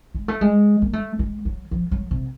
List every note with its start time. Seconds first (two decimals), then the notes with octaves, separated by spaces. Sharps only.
0.15 G#3
0.28 A3
0.41 G#3
0.82 A#3
0.93 A3
1.19 G#3
1.45 F#3
1.71 F3
1.91 F#3
2.11 C3